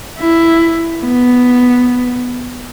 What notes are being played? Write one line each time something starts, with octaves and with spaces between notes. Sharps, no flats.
E4
B3